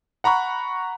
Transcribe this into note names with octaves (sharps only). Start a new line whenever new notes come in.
F#5 A#5 B5 C#6 F#6